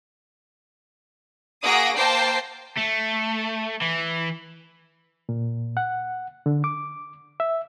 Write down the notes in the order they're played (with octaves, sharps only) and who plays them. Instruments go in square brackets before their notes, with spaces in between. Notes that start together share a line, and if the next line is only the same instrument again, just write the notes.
[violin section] A#3 F#4 G#4 D#6 A#6 D7
A#3 C5 G5 A5 C7
[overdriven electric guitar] A3
E3
[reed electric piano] A#2
F#5
D3
D6
E5